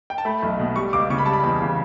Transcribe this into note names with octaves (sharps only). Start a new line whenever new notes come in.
G5
A5
A3 B5
B1
B2
G3 C#6
C#2 D6
C#3 C#6
B5
G3 A5
B5
E2
C#3